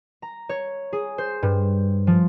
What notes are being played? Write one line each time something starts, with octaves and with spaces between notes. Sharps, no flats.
A#5
C#5
G#4
C5
G2
F3